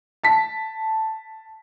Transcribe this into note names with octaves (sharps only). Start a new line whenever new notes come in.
A5 B6